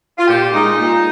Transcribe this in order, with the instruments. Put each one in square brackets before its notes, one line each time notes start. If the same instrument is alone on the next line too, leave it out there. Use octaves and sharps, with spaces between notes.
[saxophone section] F4
A#2 G4
G#3 D#4
A#2